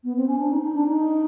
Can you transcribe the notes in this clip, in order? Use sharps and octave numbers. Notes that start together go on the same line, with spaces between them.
B3
C4
C#4
D4
D#4
D#4
D4
D#4